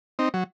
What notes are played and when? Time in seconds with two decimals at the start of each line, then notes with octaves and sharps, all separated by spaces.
0.19 C4 D#4
0.34 F#3